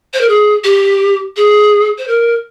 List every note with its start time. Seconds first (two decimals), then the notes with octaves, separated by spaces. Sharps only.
0.13 C5
0.21 A#4
0.28 G#4
0.64 G4
1.36 G#4
1.98 C5
2.07 A#4